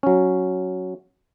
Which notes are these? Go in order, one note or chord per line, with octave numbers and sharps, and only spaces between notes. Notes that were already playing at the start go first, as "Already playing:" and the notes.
F#3 C#4